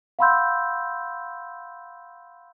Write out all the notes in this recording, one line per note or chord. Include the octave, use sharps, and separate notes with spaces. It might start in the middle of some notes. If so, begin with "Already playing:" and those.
F5 F#5 B5 C6 E6 G6